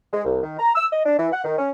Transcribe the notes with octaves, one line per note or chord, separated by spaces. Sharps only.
G#3
C2
D#3
A#5
E6
D#5
D4
E3
F#5
D#3
C#4